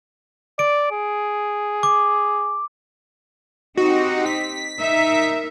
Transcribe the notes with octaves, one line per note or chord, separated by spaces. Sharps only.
D5 D7
G#4
D6
C4 D#4 F#4 G4
B6
D#4 A#4 E5